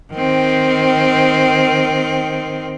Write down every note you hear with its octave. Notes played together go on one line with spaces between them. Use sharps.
D#3 C4